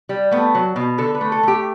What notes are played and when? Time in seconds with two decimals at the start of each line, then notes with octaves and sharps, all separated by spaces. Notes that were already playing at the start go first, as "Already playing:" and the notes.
0.09 G3
0.31 A3 B3
0.55 F#3
0.76 B2
0.98 D3 A4
1.15 B4
1.21 A3
1.32 A4
1.43 A3 G4